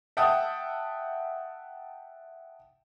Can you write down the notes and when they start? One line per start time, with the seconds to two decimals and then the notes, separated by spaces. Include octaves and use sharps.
0.17 E5 F#5 G5 A5 D#6